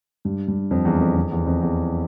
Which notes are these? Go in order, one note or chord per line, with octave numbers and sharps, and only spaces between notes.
G2
G2
F2
E2
F2
F2
E2
F2
E2